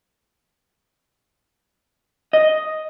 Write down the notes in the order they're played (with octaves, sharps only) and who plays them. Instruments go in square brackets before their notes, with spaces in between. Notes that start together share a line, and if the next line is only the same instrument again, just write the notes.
[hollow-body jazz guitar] D#5